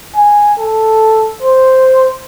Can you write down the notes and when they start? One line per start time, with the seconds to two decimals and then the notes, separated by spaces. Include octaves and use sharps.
0.16 G#5
0.59 A4
1.42 C5